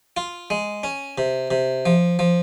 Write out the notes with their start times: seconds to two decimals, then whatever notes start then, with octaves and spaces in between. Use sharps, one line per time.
0.17 F4
0.50 G#3
0.84 C#4
1.18 C3
1.51 C3
1.86 F3
2.19 F3